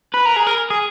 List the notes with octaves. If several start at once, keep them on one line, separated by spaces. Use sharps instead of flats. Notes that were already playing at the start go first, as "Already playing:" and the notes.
B4
A#4
G#4
A#4
G#4